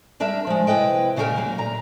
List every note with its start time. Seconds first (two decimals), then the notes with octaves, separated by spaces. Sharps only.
0.20 G3 D4 A#4 E5
0.47 F3 G#3
0.67 C3 E4 B4 D#5 G5
1.16 A#2 C#3 E4 G4 A#4 G#5
1.36 D#2 B2 F#3 A#3
1.58 A#2 D3 A#5